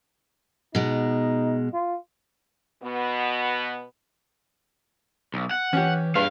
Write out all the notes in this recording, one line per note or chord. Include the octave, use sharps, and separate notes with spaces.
B2 G#3 D#4
F4
B2 B3
B1
F#5
E3 C#4 G4
G2 G#4 B4 F5